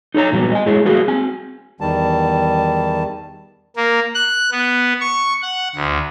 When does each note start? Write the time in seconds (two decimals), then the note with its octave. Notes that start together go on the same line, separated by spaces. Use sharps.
0.14 D#4 A4 C#5 A#5
0.32 A#2 F#3 G3 B3
0.52 D#5 G#5
0.66 G#3 E4 G#4 C#5
0.85 G3 A3 A#3 F#4 G#4
1.08 C4 G#5
1.81 E2 D#3 G3 A5
3.76 A#3
4.15 F#6
4.51 B3
5.00 C#6
5.42 F#5
5.75 D2